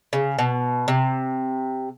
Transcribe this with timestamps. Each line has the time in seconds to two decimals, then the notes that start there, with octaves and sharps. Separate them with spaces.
0.13 C#3
0.39 B2
0.88 C3